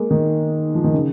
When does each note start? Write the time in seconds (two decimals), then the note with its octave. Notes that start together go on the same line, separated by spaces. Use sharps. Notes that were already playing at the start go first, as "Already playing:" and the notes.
Already playing: G#3 A#3
0.11 D#3
0.75 F3
0.84 D#3
0.94 C#3